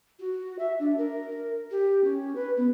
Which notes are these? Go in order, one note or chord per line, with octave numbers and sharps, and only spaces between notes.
F#4
E5
D4
A#4
G4
C#4
B4
B3